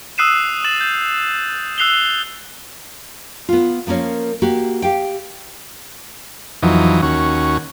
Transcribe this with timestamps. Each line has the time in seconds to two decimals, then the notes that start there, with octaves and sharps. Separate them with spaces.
0.18 D#6 E6 F#6 C7 D#7 E7
0.64 D#6 A6 E7 F#7
0.81 G6
1.78 E6 F#6 C7 F7 G7
3.49 B3 F4
3.87 F3 A#3 C#4 A#4 C#5
4.42 A#3 F#4 G4
4.82 G4 F5 G5
6.62 F2 E3 F#3 D#4
7.02 D#2 C#4 F#4